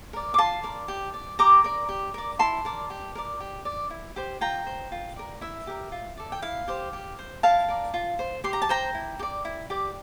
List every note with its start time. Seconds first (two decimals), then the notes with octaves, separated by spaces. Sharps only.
0.13 A#4 D5
0.34 D6
0.38 F4 A5 C6
0.63 A#4 D5
0.88 G4
1.14 D5
1.39 G4 A#5 D6
1.64 A#4 D5
1.89 G4
2.14 A#4 D5
2.39 E4 A5 C6
2.65 A#4 D5
2.90 G4
3.15 A#4 D5
3.40 G4
3.65 D5
3.91 E4
4.16 G4 C5
4.41 F4 G5 A#5
4.67 C5
4.92 F4
5.16 A#4 D5
5.41 E4 E5
5.67 G4 A#4
5.92 F4
6.17 A4 D5
6.32 G5
6.42 E4 F5
6.68 G4 C5
6.93 G4
7.19 C5
7.43 E4 F5 A5
7.69 A#4 D5
7.94 F4
8.19 C5
8.44 G4 C6
8.53 A#5
8.62 A5
8.69 C5 G5 A#5
8.94 E4
9.19 G4
9.23 D5
9.45 E4
9.70 G4 D5